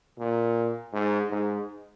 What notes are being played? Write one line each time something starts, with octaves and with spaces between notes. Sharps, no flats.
A#2
G#2
G#2